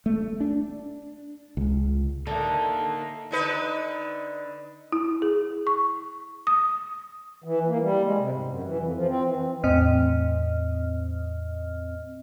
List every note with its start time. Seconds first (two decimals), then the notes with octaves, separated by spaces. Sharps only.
0.06 A3
0.40 D4
1.57 C#2
2.27 D3 A#3 D#4 E5 A5
3.31 D3 D#4 B4
4.92 E4
5.22 G#4
5.67 C#6
6.47 D#6
7.44 E3
7.67 A#3
7.81 G3
8.04 G#3
8.17 C3
8.33 G#2
8.45 F#2
8.63 E3
8.79 F2
8.94 F3
9.08 C4
9.25 E3
9.64 E2 A2 C4 D#5 F6